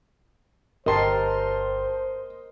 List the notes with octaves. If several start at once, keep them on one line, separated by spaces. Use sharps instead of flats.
G1 G4 A#4 C5 D#5 A5 C6 C7